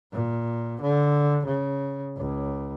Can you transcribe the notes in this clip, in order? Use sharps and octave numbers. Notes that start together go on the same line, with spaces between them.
A#2
D3
C#3
C#2